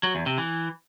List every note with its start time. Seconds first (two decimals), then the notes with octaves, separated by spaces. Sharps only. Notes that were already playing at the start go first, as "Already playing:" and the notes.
0.03 F#3
0.15 E2
0.26 C3
0.38 E3